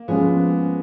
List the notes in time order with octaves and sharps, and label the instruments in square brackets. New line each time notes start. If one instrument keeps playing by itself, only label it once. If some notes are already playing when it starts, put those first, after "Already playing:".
Already playing: [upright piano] A#3
[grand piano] F3 G#3 C#4 [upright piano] B3